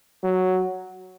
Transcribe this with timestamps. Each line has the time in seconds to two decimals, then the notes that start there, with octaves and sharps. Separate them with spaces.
0.24 F#3